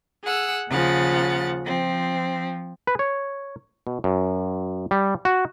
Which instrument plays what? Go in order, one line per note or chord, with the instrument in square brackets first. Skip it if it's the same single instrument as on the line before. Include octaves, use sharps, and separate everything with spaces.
[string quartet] G#4 F#5 E6
D#2 C#3 F3 F#5 A6
F3 C4
[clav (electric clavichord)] B4
C#5
B2
F#2
G3
F#4